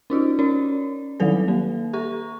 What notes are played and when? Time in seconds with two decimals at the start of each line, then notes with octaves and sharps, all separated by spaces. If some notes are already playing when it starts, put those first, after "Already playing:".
0.10 C#4 D#4 F4 F#4
0.39 C#4 C#5 D5
1.20 D#3 F#3 G3 A4 B4
1.48 A#3
1.93 G4 A4 A#5 C#6